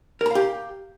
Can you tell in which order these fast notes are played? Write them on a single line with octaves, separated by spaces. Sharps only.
A#4 A#5 F5 G4